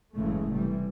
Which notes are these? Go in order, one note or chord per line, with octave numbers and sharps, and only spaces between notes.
F#1 A2 C#3 E3 G#3 A3
C3 E3 G3